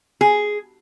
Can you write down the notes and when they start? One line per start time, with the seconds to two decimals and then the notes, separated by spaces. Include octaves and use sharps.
0.21 G#4